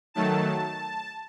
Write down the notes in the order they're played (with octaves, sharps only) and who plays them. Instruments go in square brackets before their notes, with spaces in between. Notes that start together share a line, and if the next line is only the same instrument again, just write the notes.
[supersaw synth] D#3 F#3 A3 A5